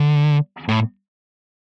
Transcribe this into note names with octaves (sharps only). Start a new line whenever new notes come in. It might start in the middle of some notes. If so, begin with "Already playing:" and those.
Already playing: D3
A2